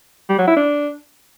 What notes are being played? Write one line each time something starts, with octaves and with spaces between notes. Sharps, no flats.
G3
F#3
E4
D4